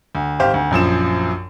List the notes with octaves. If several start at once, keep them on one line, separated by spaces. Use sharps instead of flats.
D2
G#1 G4 C5 F5
D2
A#1 F#2 F3 E7